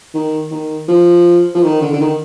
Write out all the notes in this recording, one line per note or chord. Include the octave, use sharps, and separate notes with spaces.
D#3
D#3
F3
F3
D#3
D3
D3
D#3